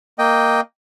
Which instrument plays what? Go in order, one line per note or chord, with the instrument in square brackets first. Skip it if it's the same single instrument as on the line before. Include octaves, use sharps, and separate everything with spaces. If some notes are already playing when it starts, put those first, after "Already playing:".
[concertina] A#3 D#5 G5